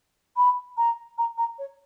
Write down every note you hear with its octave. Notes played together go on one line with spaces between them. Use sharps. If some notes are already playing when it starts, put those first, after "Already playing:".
B5
A#5
A#5
A#5
C#5